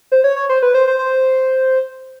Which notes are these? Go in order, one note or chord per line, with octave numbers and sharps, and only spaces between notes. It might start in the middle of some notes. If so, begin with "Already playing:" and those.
C5
C#5
C#5
C5
B4
C5
C5
C5